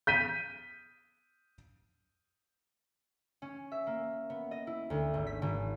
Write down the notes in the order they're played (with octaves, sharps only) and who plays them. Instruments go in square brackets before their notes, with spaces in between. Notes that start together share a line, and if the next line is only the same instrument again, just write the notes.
[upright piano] G6 B6 D#7
[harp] C#4
E5
A#3
B3
D#5
E4
D2
G#1
B6
G#1